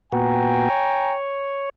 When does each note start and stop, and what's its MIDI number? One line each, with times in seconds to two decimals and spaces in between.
0.12 0.69 46
0.12 0.69 59
0.12 0.69 66
0.12 1.14 79
0.12 1.14 80
0.12 1.14 82
0.70 1.69 73